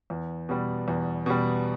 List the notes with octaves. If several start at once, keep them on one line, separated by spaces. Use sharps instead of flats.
E2
B2 G3
E2
B2 G3